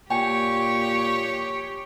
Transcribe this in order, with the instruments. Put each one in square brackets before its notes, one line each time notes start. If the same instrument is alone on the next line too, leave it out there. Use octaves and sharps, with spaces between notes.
[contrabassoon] A#2 [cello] G4 [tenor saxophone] C#5 [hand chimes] G5 G#5 C#7